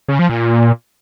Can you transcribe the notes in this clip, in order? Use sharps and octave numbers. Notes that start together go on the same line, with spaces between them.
C#3
F3
A#2